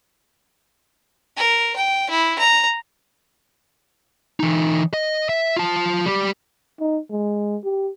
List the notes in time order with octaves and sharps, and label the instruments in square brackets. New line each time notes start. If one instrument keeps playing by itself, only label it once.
[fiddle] A#4
G5
E4
A#5
[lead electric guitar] E3 D#4
D#5
E5
F4 A5
G3 G4
[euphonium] D#4
G#3
G4